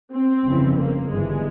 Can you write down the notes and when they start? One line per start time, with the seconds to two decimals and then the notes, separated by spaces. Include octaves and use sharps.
0.13 C4
0.45 G1 F2 C#3 E3
0.77 A#3
1.10 G1 G2 E3 G#3